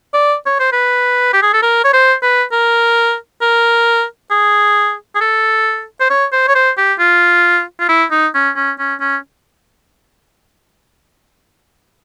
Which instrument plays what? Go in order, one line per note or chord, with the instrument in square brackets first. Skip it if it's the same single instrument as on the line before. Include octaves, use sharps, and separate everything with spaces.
[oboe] D5
C#5
C5
B4
G4
G#4
A4
A#4
C#5
C5
B4
A#4
A#4
G#4
G#4
A4
C5
C#5
C5
C#5
C5
G4
F4
F4
E4
D#4
C#4
C#4
C#4
C#4